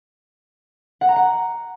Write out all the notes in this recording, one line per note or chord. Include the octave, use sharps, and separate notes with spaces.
F#5
A#5
F#5